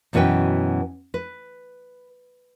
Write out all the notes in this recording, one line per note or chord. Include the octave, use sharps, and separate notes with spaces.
F#2 B2 E3 C#4 B4 G5
B4